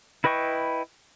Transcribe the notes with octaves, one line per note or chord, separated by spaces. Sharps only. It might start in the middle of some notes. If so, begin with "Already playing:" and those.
E4 B4 D#5 G5 C#6